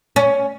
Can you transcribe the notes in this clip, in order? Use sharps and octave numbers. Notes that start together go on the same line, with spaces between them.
C#4